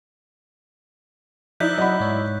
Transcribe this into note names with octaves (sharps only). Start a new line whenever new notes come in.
F3 D#4 E4 D5 F#6 G6 B6
F#3 D#5 F#5 B5
G#2 C#5